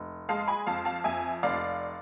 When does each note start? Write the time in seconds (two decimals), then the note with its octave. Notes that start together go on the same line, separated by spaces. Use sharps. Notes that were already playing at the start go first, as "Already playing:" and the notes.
Already playing: F1
0.29 G#3 F5 A5
0.48 G#5 B5
0.67 F2 F5 A5
0.85 F5 A5
1.04 F2 E5 G#5
1.43 F1 D5 F5